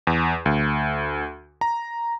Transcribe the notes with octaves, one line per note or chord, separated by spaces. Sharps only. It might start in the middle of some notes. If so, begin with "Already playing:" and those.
E2
D2
A#5